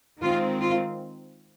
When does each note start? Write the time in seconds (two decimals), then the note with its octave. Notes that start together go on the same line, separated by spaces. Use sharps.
0.23 D#3 G#3 C4 F4
0.61 F4